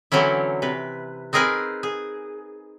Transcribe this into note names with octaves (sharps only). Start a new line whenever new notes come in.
D3 E3 F#3 C4 C#4 E4
C3 B4
C4 D#4 G#4 A#4 B4 G#5
G#4